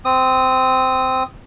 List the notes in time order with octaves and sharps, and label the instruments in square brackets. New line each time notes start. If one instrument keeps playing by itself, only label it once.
[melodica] C4 D#6